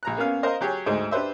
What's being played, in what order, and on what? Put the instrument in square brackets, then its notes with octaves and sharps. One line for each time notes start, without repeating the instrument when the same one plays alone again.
[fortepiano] A#1 A#5 F#6
A#3 B3 C#4 F5
A#4 C5 D#5 F5 A#5
F#3 G4 G#4 C#5
D2 G#2 C5
D4 G4 B4 C5 E5